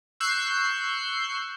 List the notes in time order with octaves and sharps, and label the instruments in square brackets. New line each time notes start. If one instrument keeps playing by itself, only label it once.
[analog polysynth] C#6 E6 F#6 G6 C7